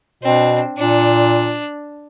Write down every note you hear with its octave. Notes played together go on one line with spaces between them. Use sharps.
B2 C4 D4
A#2 D4